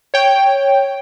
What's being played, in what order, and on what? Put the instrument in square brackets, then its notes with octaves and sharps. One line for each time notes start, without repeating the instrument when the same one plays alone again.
[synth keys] C#5 G5